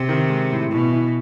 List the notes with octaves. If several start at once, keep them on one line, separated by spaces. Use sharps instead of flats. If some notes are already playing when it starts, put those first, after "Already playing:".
Already playing: C3
D#3
G#3
A2
B2 E3
E3